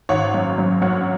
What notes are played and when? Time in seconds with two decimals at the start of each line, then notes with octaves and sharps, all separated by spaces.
0.09 G#1 C#5 F#5
0.34 F#2
0.58 F#3
0.82 F#2 C#5 F#5